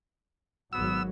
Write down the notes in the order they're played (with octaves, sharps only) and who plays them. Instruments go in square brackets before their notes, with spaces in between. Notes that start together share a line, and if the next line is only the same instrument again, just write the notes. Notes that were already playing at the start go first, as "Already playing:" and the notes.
[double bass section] G#1 F#3 [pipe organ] B3 [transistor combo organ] E6